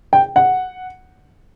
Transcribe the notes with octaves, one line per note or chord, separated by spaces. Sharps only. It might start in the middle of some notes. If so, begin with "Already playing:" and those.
G5
F#5